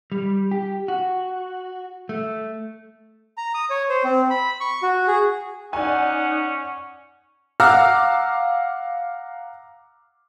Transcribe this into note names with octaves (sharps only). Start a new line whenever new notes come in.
G3
G4
F#4
A3
A#5
D#6
C#5
C5
C4
B5
C#6
F#4
G#4
C#4 D#4 D5 F#5 G#5
F5 F#5 A#5 D6 E6 F6